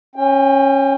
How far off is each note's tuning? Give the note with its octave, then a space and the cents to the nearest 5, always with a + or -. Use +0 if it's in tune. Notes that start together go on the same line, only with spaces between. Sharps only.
C#4 -15 G5 +20